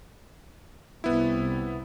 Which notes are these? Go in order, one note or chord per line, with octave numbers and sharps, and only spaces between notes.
C2 C3 B3 E4